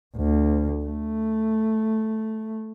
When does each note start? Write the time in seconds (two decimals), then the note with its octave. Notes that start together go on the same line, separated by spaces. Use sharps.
0.17 D2
0.85 A3